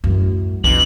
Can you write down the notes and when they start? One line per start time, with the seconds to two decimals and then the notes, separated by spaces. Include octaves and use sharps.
0.04 F#2 A2
0.64 B1 F2 D4 F#7